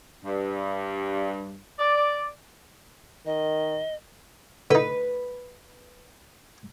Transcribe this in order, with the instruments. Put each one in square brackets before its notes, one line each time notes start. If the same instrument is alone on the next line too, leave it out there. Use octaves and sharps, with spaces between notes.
[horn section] G2
D5
[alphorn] D#3 [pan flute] D#5
[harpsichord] D3 D#4 [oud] B4